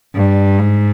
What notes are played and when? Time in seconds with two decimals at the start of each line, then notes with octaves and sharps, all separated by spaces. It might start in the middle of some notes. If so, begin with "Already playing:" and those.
0.15 G2
0.58 G#2